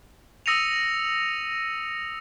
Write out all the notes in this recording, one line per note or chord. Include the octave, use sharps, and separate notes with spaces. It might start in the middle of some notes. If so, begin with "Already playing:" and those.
D#6 E6 A#6 C#7 D#7 F7